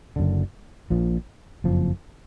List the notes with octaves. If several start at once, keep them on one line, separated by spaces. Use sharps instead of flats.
F#1 F#2 D3
A#1 A#2 F3
F#1 F2 F3